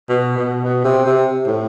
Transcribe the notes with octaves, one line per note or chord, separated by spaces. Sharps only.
B2
B2
B2
C3
C3
A2